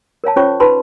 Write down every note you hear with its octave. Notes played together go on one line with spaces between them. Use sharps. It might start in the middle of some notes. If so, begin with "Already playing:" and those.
A#4 C#5 F5 A5
C#4 F4 C5 C#5 C#6
D#4 B4 A5 B5 C6